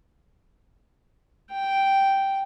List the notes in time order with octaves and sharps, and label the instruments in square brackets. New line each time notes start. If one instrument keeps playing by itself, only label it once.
[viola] G5